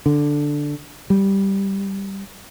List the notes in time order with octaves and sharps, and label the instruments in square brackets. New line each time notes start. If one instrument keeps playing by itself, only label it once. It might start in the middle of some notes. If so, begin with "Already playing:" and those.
[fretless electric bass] D3
G3